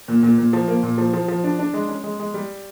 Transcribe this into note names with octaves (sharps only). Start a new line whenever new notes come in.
A#2
A#2
A#2
F3
A#3
A#2
F3
F3
F3
D4
D4
G#3
C#4
G#3
G#3
G3